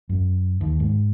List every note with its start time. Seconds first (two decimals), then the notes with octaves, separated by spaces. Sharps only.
0.09 F#2
0.61 D#2
0.80 G#2